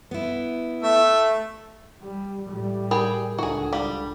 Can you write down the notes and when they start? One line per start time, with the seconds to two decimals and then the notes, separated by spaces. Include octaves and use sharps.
0.11 B3 E4
0.83 A3 E5
2.02 G3
2.49 A2 G3
2.91 G#4 A#4 G5 B5
3.39 C#2 D3 F#4 G#4
3.73 G3 F5 D#6